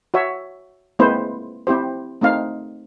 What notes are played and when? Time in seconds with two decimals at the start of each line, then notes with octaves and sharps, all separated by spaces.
0.14 F#4 C#5 E5
0.99 G#3 A#3 C4 E4 B4 C5
1.67 C4 E4 G4 C5
2.21 A3 C4 D#4 F5